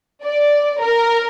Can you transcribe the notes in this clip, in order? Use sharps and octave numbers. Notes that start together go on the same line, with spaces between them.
D5
A#4